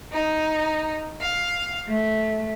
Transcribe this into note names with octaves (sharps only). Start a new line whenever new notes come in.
D#4
F5
A3